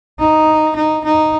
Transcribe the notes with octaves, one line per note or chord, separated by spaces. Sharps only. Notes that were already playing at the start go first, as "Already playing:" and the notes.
D#4
D#4
D#4